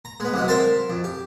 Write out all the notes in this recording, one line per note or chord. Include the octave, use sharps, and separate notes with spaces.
A#5
G#3 B3
C2 F#3 G#3
A#4 C5 E5 F5 A5 C6
F2
G4